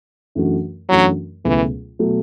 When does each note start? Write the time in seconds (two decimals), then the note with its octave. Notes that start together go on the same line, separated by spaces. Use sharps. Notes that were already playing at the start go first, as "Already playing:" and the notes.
0.35 F#2 E3 A3 D4 F#4
0.89 F#2 E3 F#3 A3 D4 F#4
1.44 C#2 B2 E3 F#3 A3
1.99 B2 F#3 A3